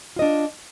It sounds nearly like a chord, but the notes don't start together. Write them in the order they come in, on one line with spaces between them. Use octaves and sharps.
F4 D#5 D4